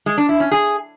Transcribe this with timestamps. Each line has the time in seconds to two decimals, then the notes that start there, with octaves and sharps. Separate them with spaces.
0.06 G#3
0.18 D4
0.29 E4
0.40 C#4
0.51 G#4